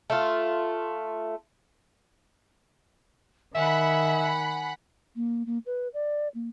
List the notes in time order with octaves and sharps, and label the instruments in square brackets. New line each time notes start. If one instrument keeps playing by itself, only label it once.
[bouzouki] A3 F4
[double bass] D#3 [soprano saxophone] E5 [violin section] F#5 B5 [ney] G#5
[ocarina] A#3
A#3
B4
D5
A#3